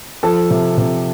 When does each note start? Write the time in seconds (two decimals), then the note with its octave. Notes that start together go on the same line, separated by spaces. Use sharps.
0.23 F3 A4 A5
0.51 C3
0.78 C3